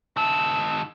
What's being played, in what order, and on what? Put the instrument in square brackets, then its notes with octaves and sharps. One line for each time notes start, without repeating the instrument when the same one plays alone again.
[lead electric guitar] D#3 A5 [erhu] E6